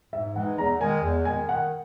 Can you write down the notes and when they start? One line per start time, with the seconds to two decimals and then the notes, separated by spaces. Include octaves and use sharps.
0.12 G#2 E5
0.35 E3 G#3 D#4 F#5
0.58 E2 A#5
0.80 D#3 G#3 G#5
1.03 E2
1.25 D#3 G#3 G#5
1.48 D#3 F#5